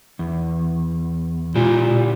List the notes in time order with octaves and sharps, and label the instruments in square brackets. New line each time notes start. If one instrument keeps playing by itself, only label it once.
[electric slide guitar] E2
[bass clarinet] A#2 [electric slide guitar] G#3 E4 G4